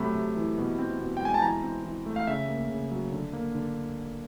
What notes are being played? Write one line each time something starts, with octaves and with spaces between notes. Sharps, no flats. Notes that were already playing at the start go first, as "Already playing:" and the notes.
Already playing: C3 F#3 A3 B5
C3
E3
B2
C4
B2
G5
G#3 G#5
A5
E3 A#5
C4
E3
A3
F5
C#3 E5
A#3
C#3
F#3
D3
A#3
D3